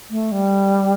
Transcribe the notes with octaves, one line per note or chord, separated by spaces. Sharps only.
A3
G3